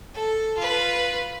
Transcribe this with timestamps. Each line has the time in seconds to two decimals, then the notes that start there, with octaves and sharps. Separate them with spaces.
0.14 A4
0.57 F4 B4